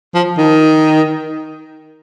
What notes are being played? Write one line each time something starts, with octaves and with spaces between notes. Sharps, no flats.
F3
D#3